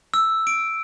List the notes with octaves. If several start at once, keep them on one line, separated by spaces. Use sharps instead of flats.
E6
D7